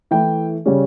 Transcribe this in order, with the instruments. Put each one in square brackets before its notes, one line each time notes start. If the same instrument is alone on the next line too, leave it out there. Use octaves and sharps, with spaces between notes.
[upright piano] E3 A3 E4 G5
C#3 G3 C#4